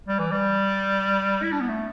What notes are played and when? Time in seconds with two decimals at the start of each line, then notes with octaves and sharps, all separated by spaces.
0.08 G3
0.19 E3
0.32 G3
1.43 E4
1.52 D4
1.61 B3
1.69 A3